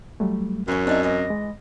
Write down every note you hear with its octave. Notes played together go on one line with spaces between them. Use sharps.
F#3 G3 A3
F#2 E3 C#4
C4 D4 D#4 E5
E3 D#5
G#3